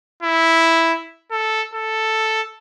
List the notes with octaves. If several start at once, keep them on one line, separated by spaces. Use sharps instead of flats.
E4
A4
A4